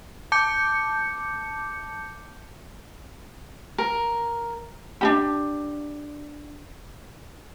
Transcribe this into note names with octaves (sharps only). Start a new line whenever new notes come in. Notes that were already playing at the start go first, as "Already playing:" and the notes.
A5 D6 G6 C#7
A#4
D4 D#4 G4